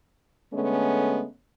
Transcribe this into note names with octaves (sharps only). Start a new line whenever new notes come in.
D3 G#3 A3 B3 C#4